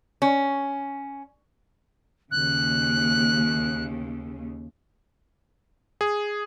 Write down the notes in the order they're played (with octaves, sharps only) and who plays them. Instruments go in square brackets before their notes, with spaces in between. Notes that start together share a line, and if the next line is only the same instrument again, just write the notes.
[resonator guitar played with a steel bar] C#4
[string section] D#2 C#3 [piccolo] F#6
[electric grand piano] G#4